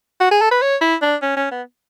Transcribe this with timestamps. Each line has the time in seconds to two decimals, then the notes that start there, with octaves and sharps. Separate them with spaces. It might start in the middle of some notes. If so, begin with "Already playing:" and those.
0.20 F#4
0.31 G#4
0.41 A4
0.52 B4
0.62 C#5
0.81 E4
1.02 D4
1.22 C#4
1.37 C#4
1.51 B3